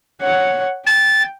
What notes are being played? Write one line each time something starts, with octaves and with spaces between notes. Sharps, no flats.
C#5 F#5
G5 A6